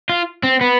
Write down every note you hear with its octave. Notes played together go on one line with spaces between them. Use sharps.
F4
C4
B3